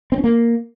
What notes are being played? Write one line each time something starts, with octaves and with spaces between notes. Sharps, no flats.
C4
C#4
A#3